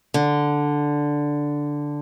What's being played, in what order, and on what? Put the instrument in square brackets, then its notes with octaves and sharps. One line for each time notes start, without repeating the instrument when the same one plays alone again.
[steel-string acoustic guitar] D3